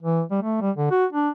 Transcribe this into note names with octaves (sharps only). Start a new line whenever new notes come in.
E3
G3
A3
G3
D3
F#4
D4